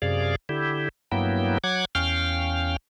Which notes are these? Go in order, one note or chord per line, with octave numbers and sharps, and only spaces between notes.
F#2 C3 G#4 D5 F5
D3 E4 G4
G2 F#3 A#3 B3 E4 G5
F#3 F#5 D6 G#6
E2 C#4 F5 G5 F6